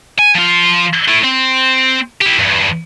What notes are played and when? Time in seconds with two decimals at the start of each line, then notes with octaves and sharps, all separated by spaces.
0.19 G#5
0.35 F3 F4
1.08 A3 E4
1.24 C4
2.21 E4 G4
2.38 E2 G2